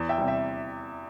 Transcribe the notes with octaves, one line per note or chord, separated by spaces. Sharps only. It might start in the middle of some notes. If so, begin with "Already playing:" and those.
Already playing: E2
E5 G5
C3 G3
E5 G5